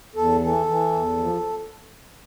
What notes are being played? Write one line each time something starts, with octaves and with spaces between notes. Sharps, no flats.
E2 A4
E3 A4
E3
E2
F3